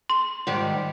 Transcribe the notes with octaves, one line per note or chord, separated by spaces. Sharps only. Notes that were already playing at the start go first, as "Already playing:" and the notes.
C6
G#2 D#3 G3